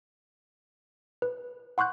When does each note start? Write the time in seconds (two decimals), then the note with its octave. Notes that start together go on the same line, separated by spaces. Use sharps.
1.22 B4
1.78 F#5 C6 C#6 F#6 G6